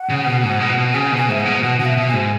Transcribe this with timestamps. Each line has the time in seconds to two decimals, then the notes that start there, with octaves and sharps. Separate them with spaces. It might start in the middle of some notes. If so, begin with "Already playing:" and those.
Already playing: F#5
0.09 C#3
0.26 B2
0.43 G#2
0.60 B2
0.77 B2
0.94 C#3 G#5
1.11 B2
1.17 G#5
1.28 G#2 E5
1.40 F#5
1.46 B2
1.63 B2 F#5
1.79 B2 F#5
1.85 E5
1.97 B2
2.08 G#5
2.13 G#2